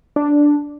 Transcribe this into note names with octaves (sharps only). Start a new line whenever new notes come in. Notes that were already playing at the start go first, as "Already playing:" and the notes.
D4